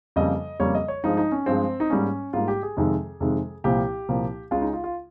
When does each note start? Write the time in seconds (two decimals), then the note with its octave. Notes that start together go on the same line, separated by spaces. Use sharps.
0.16 F2 C#3 G3 A#3 D#5
0.60 F2 C#3 G3 A#3 C#5
0.75 D#5
0.88 C#5
1.04 G2 F3 G#3 D#4
1.17 D#4
1.32 C#4
1.46 G2 F3 G#3 C4
1.80 D#4
1.90 G#2 G3 A#3 C#4
2.33 G#2 G3 A#3 F4
2.48 G4
2.63 G#4
2.77 F2 C3 D#3 G#3
3.20 F2 C3 D#3 G#3
3.64 C2 A#2 F3 A#3 G4
4.09 C2 A#2 F3 A#3
4.51 C#2 C#3 G#3 F4
4.62 D#4
4.73 F4
4.84 F4